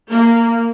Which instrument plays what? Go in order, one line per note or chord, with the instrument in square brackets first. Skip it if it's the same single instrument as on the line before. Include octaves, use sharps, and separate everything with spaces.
[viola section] A#3